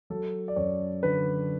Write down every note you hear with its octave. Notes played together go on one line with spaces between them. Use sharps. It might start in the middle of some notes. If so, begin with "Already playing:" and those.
F#3 A4
D5
F#2 C#5
D3 B4